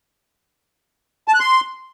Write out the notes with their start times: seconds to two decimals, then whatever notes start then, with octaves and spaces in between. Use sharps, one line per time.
1.28 A5
1.34 F#6
1.40 C6